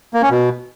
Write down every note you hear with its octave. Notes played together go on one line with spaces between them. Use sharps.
A#3
C#4
B2